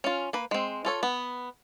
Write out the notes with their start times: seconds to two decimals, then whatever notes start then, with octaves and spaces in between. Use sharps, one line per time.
0.04 C#4 F4
0.33 A#3 B4
0.51 G#3 C4
0.85 F4 A4 C#5
1.03 B3